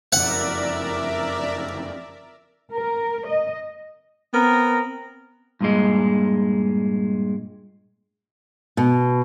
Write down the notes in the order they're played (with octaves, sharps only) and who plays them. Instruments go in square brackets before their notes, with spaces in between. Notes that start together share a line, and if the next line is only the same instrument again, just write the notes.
[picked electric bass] F#1 F2 [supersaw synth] A#4 D5 E5 [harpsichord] F#5
[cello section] A#4
D#5
[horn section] B3 C4 A#4
[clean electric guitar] G2 A#2 G#3
[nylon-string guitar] B2